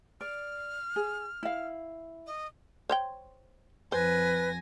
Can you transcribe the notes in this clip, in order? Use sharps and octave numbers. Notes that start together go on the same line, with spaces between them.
D5 F6
G#4
E4 F5
D#5
C5 C#5 G5
F2 B4 C5 G#5 A#6